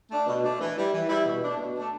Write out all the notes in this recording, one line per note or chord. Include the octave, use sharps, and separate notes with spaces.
A3 D4
B2
A3 D4
E3
G3 E4
E3
G3 E4
B2
A3 D4
B2
A3 D4